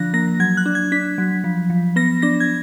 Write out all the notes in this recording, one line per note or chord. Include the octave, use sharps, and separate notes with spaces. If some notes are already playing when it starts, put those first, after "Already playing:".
Already playing: D3 F3 D4 F#6 A#6
A#3 A#6
F#3 G#6
F#6
D4
G#6
D4 B6
F#3
F3
F3
B3 A#6
D4 A#6
G#6